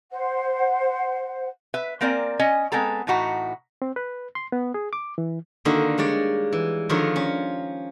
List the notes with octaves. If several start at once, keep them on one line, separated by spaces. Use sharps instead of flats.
C5 F#5
B4 E5
A#3 C4 A#4 D5 F#5 G#5
C#4 D#5 G#5
G#3 B3 C4 A4 A#5
A2 E3 D#4 F#4 A#5
C4
B4
C6
B3
G#4
D6
E3
D3 D#3 A#3 D#4 F#4 A#4
G3 G#3 C#5 D5
E3
D3 D#3 F3 F4 A#4 C#5
C#4